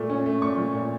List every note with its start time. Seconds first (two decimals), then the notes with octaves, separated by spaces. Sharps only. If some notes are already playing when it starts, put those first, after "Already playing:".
Already playing: A#2 A3
0.10 C#4
0.26 A3
0.42 A#2 C#6
0.58 F3
0.74 A#2